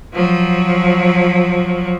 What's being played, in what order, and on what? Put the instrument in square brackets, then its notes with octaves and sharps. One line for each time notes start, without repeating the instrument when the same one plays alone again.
[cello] F3 F#3